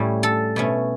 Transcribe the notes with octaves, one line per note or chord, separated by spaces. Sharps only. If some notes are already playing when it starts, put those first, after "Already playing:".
Already playing: A2 G3 C#4
A4
B2 A3 C#4